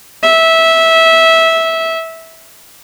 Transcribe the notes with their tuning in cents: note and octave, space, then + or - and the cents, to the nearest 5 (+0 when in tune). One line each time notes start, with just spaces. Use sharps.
E5 -15